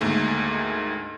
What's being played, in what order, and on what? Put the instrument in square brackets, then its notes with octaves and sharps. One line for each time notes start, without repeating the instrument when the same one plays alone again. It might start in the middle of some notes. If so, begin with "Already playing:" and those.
[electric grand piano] D2 G#2 D#3 A3 A#3